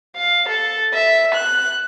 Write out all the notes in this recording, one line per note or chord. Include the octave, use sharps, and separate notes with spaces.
F5
A4
E5
F#6